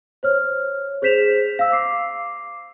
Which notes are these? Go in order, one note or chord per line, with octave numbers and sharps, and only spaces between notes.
C5 C#5 F6
G#4 C5 G6 B6 E7 F7
F5 E6
D6 C7